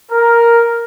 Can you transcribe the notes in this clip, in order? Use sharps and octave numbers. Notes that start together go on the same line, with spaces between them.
A#4